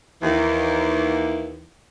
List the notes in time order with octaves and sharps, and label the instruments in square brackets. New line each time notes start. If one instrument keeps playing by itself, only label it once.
[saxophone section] D#2 E3